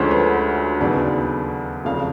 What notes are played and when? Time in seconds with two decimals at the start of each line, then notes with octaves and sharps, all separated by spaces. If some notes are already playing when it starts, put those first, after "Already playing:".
Already playing: D2 D3 F3 G#3 C#4 C5
0.11 B4
0.80 D#2 C#3 F#3 B3 D5
1.85 F1 F2 C#3 F5